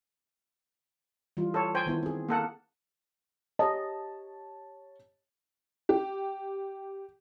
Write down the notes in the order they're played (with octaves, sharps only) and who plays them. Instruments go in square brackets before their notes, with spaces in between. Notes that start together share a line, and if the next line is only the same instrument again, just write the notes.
[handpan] E3 G3 F4
[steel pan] A4 C#5
C5 G5 G#5
[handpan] D#3 B3 E4
C4 G#4
[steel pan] A#3 A4 F#5
[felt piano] G4 C#5 A5 [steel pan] D#5
[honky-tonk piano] G4